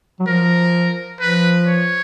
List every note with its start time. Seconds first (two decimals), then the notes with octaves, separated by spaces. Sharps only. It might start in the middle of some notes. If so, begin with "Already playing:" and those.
0.20 F#3
0.27 F3 A#4
1.20 F3 B4
1.67 C#5